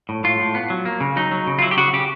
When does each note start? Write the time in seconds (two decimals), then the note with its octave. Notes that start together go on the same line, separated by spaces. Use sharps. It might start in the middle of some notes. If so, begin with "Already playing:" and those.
0.09 A2
0.24 A2 F4
0.40 A2
0.55 B3
0.70 F#3
0.85 A#3
1.01 C#3
1.16 F#3 D#4
1.31 F#3
1.47 C#3
1.59 F4
1.62 F#3 E4
1.71 G4
1.77 C#3 F#4
1.93 C#3 G4